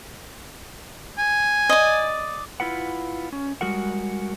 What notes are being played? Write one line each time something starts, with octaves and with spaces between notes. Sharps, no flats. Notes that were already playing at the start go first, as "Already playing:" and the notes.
G#5
D5 D#5
E4 F4 B4 F#5
C#4
G3 G#3 F#4 A#4 F#5